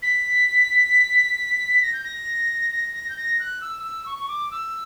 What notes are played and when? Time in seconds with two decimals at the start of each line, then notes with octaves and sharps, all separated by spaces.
0.02 B6
1.82 A#6
1.93 G6
2.04 A#6
2.72 A#6
2.94 A#6
3.09 G6
3.17 A#6
3.39 F#6
3.61 E6
3.83 E6
4.06 C#6
4.19 C#6
4.28 D6
4.51 E6